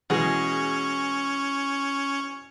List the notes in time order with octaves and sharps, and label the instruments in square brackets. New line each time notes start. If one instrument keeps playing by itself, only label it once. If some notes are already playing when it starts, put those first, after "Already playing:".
[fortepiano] B2 E3 G#3 [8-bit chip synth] C#4 C#5 [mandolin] G#4